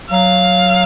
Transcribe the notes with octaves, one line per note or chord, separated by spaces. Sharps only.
F#3 F5